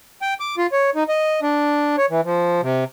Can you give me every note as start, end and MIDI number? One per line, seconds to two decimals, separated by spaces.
0.22 0.34 79
0.40 0.56 86
0.57 0.67 65
0.72 0.90 73
0.95 1.04 63
1.08 1.40 75
1.42 1.96 62
1.98 2.06 73
2.10 2.21 52
2.25 2.61 53
2.62 2.84 48